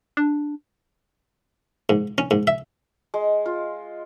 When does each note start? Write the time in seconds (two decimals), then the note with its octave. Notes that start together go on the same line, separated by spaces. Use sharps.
0.17 D4
1.89 G#2
2.18 C#4
2.31 G#2
2.47 E5
3.14 G#3
3.46 F4